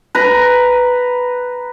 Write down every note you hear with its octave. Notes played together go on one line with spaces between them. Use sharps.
B4 A#5